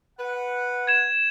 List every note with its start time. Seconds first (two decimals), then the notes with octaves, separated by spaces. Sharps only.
0.19 B4 F#5
0.87 G#6 E7